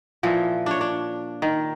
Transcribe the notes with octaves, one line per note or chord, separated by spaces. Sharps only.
A#2 E3 F3
D4 C#5
D4
D#3